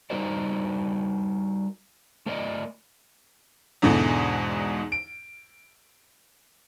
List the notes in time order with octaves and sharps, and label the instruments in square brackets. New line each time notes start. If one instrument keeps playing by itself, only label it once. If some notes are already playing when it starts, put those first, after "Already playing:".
[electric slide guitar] G3 D#4 F#4 A#4 C5 D5
A3 A#4 C5 D5 D#5
[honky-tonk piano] E2 G#2 B2 D3 E3
D7